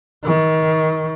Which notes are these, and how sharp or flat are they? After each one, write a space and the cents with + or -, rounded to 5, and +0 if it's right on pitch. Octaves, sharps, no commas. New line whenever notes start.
D#3 +30